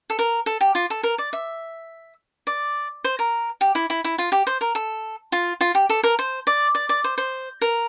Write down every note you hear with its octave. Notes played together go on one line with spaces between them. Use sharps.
A4
A#4
A4
G4
F4
A4
A#4
D5
E5
D5
C5
A#4
G4
E4
E4
E4
F4
G4
C5
A#4
A4
F4
F4
G4
A4
A#4
C5
D5
D5
D5
C5
C5
A#4